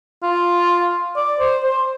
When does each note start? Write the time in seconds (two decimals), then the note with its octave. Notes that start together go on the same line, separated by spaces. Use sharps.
0.23 F4
1.16 D5
1.39 C5
1.63 C5